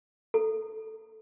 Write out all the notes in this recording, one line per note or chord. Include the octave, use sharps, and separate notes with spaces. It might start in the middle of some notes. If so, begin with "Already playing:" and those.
A4